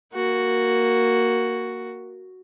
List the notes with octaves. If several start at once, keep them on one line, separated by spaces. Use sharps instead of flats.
A#3 F#4